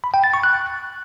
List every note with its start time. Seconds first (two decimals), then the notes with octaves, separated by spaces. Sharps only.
0.04 B5
0.14 G5
0.24 A6
0.34 C#6
0.43 F#6